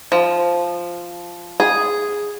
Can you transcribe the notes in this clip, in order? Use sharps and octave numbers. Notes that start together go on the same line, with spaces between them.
F3
G#4